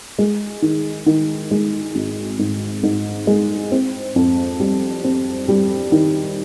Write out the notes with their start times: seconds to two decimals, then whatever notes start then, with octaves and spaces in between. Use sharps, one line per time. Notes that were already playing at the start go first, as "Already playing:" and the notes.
0.18 G#3
0.62 D#3
1.06 D#3
1.51 G#3
1.95 G#1
2.39 G#2
2.83 G#2
3.27 G#3
3.72 C4
4.16 F2
4.60 G3
5.04 C4
5.48 G3
5.92 D#3